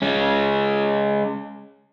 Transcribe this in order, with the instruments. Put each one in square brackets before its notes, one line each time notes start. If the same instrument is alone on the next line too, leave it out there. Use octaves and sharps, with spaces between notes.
[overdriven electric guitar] G#3 C#4